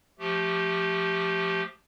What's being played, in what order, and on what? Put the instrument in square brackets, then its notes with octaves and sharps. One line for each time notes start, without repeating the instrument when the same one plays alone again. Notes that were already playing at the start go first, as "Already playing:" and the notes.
[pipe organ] F3 A3 G4